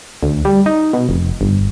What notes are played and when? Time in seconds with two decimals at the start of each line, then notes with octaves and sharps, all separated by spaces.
0.23 D2
0.45 G3
0.66 D#4
0.93 B2
1.09 F1
1.41 G1